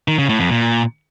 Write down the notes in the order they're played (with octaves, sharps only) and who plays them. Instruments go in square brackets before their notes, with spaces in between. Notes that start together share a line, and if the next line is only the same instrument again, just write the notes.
[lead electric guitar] D#3
C#3
A2
F2
A#2